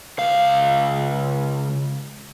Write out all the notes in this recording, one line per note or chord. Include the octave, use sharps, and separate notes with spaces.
C#2 F5